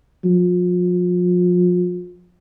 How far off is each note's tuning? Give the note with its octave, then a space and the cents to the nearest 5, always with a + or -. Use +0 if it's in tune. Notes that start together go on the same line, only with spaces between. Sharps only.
F3 +35